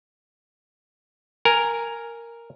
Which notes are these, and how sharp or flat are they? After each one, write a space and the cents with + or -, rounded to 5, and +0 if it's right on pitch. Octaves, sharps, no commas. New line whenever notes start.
A#4 +0 G#5 +0